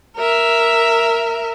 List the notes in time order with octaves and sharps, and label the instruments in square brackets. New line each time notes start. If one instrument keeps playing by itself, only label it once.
[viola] A#4 E5